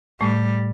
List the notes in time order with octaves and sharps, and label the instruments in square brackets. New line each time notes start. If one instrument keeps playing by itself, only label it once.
[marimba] A2 A3 [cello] G3